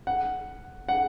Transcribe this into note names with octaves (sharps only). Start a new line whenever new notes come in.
F#5
F#5